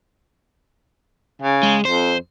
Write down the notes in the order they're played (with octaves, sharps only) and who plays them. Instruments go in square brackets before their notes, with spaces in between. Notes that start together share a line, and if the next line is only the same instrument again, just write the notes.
[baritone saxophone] C#3
[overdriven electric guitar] G#3
[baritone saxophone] F2 [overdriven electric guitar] C5